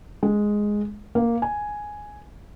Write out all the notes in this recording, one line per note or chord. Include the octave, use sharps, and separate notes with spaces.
G#3
A#3
G#5